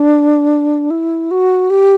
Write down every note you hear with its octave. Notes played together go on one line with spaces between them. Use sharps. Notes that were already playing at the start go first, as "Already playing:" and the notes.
Already playing: D4
E4
F#4
G4